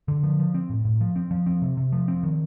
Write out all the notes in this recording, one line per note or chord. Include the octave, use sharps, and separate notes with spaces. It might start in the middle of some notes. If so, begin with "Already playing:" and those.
D3
F3
F3
C4
A2
A2
F3
C4
F3
C4
C3
C3
F3
C4
D#3